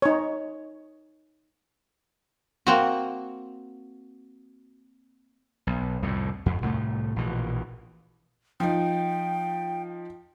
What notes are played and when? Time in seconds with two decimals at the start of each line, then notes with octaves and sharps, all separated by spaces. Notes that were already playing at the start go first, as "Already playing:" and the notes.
0.02 D#4 C#5
2.67 A#3 C4 F#4
5.67 B1
6.02 C2 F2 A2
6.46 F2
6.62 C2 A2 G#3 A3
7.16 A#1 B2 E3
8.60 F3 D#4 G5